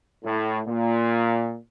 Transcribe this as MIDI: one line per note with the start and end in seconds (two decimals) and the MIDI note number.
0.23 0.58 45
0.67 1.54 46